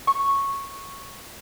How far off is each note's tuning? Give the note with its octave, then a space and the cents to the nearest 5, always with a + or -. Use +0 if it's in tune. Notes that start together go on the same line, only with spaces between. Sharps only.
C#6 -5